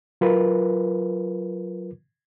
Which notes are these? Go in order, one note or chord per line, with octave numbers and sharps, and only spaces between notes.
F#3 F4 A#4 B4